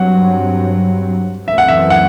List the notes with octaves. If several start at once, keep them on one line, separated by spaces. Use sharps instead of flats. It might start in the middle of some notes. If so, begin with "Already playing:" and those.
Already playing: G2 F#3 C4 F#5
F#2 E3 A3 C4 E5
F#5
E5
F#5